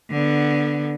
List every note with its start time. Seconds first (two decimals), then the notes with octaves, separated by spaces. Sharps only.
0.11 D3 B3